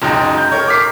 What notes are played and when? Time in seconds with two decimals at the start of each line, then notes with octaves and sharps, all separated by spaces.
0.02 F#1 C#2 F#2 D#4 G5
0.38 G6
0.52 A#4 C#5
0.68 D6 F6 B6 C7